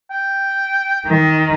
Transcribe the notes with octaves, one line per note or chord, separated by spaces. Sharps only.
G5
D#3